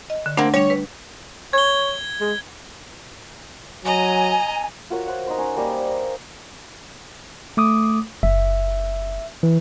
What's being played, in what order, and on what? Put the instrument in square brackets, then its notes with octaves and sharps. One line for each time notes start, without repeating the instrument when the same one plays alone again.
[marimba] D#5
D3
[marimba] A3 D4 F#5 [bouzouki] A#3 C4
[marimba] G3 D4 [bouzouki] C#5
[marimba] B4
[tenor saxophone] C#5 [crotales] G#6 G7
[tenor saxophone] G#3
[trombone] F#3 [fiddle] D#5 A#5 [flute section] G#5
[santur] F4 F#4 A#4 C#5
C5 F#5
D#4 D#5 C6
C#4 D#4
G3 A#3 C5 D#5
G#5
[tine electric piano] A3 D6 D#6
[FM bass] F#1 [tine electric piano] E5
[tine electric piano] E3